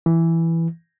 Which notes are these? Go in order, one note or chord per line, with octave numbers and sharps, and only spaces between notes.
E3